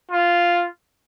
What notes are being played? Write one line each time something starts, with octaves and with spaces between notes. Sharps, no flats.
F4